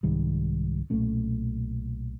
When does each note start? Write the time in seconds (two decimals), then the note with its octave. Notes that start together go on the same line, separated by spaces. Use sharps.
0.03 C2 G#2 D#3 G3
0.90 B1 A#2 A3 C#4